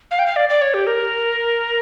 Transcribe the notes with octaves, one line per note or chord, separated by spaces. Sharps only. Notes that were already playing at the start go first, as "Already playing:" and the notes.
F5
G5
F5
D5
D5
C#5
G4
A#4